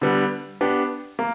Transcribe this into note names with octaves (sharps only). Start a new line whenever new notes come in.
D3 G3 B3
B3 D4 G4
A#3